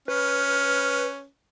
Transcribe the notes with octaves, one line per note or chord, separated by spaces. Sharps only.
C#4 B4 F6